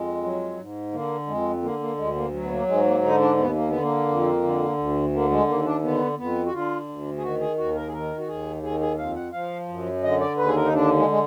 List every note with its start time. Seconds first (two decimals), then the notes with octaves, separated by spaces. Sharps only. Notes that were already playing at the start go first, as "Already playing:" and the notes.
Already playing: F2 G#3
0.23 F#3
0.57 G#2
0.92 D3 A#3
1.27 F2 G#3
1.62 D3 A#3
1.80 A#3
1.97 D2 G#3
2.16 A#3
2.33 F#3
2.43 B3
2.51 A#3
2.68 G#2 G#3
2.85 A#3
3.02 D3 D#4
3.20 D4
3.37 D#2 B3
3.55 A#3
3.69 D3 B3
3.82 A#3
4.08 F2
4.43 D3
4.78 D2
5.13 D3 A#3
5.31 G#3
5.48 D#2 A#3
5.65 D4
5.83 D3 B3
6.18 F2 B3
6.46 F#4
6.53 D3 F4
6.89 D2
7.18 G#4
7.23 D#3 F#4
7.40 G#4
7.58 D#2 F#4
7.75 A#4
7.88 G#4
7.93 D#3 A#4
8.18 F#4
8.27 D#2 G#4
8.63 D#3 G#4
8.80 G#4
8.98 F2 F5
9.16 F#5
9.33 F3 F5
9.68 F#2
10.02 D3 D#5
10.21 D5
10.37 D#2 B4
10.47 G#4
10.56 A#4
10.65 D#4
10.73 D3 D4
10.97 G#3
11.10 G#3